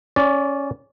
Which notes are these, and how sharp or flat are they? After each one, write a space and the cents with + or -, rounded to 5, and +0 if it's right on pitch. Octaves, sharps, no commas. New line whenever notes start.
C#4 +0 D5 -15